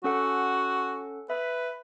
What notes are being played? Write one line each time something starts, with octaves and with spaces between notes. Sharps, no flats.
C#4 F#4 A4 F#5
B4 E5